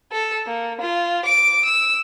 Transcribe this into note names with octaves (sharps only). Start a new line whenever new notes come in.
A4
A#3
F4
D6 D7
E6